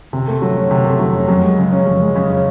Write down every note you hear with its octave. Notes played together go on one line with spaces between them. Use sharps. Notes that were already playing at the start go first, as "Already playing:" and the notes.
C3
A3
F#3
C#4
C3
A3
F#3
C#4
F#2
G#3
C#3
C#4
F#2
G#3
C#3
C#4